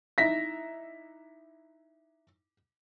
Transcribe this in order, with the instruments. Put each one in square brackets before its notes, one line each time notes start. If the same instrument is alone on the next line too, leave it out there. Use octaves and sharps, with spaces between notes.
[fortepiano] D#4 E4 E5 [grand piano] A#6 B6